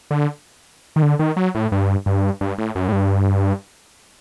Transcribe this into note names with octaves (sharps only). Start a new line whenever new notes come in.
D3
D#3
D3
D#3
F#3
A2
G2
G2
G2
A2
F#2
A2
G2